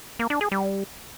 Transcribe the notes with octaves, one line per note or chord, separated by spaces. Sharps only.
A#3
D4
G#4
G3